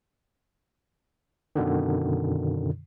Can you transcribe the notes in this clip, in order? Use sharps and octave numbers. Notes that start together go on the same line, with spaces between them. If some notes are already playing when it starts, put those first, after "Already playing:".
F#2 B2 D3 D#3